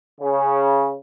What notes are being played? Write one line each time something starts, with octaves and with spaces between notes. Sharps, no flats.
C#3